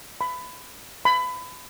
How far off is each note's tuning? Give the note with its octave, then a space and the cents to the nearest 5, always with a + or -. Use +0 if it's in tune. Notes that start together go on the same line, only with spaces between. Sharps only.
B5 +20
B5 +25